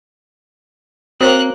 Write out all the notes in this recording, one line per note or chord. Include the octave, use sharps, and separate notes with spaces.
A#3 C4 F#4 C5 C#5 F#6